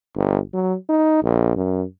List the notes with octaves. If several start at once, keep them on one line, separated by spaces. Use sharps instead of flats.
G1
F#3
D#4
A#1
F#2